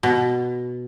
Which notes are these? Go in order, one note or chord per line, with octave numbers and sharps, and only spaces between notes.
B2